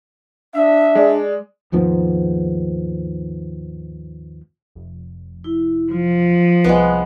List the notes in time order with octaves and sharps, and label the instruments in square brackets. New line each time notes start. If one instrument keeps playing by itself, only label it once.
[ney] D4 [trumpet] E5
[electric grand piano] G#3 D5
[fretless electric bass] D#2 G#2 F3 B3
[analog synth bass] F1
[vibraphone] E4
[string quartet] F3 [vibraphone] F4
[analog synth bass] C2 [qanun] G#3 B3